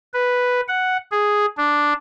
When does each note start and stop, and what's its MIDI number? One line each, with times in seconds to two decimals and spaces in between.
0.14 0.61 71
0.68 0.97 78
1.11 1.46 68
1.57 1.93 62